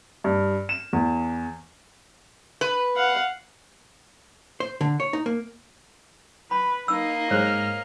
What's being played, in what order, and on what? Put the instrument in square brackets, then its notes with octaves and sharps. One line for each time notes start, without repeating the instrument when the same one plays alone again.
[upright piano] G2
E7
E2
[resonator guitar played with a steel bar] B4
[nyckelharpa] F5 F#5
[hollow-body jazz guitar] C5
D3
C#5
D#4
A#3
[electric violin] B4 [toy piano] B5
[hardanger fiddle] A#3 D#5 [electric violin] D#4 [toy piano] E6
[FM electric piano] G#2 G#3 [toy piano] C5 C#5 [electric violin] F6